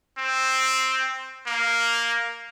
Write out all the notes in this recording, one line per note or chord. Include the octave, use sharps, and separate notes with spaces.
C4
A#3